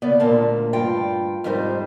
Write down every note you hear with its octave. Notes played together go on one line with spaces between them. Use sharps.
C#3 B3 D5
D2 A#2 A#3 A5
G2 F4 G5
F2 G#2 G3 D#4 B4 C5